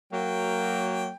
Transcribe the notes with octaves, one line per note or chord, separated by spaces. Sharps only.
F#3 A#3 G5